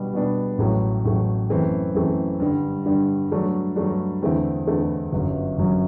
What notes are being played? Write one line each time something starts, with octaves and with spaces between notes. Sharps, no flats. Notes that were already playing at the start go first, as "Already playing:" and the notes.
Already playing: B2 G3 B3 D4
B2 G3 B3 D4
A1 A2 F#3 A3
A1 A2 F#3 A3
F#2 E3 A3 C4
F#2 E3 A3 C4
G2 D3 G3
G2 D3 G3
G2 F#3 A3 D4
G2 F#3 A3 D4
E2 D3 A3 C4 E4
E2 D3 A3 C4 E4
G1 F#2 F#3
G1 F#2 F#3